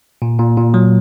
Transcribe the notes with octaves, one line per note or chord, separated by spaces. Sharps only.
A#2
A#2
A#2
F#3